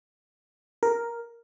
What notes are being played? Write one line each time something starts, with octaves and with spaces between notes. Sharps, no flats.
A#4